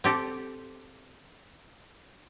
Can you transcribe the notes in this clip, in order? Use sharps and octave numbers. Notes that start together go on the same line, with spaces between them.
C4 G4 A4